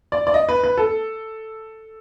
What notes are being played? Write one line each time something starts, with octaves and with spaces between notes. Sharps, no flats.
D5
D5
D#5
B4
B4
A4